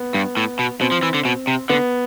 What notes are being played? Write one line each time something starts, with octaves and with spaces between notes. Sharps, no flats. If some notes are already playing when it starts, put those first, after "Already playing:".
Already playing: B3
G2
A2
B2
B2 C4
F3
E3
D3
B2
C3
D3 B3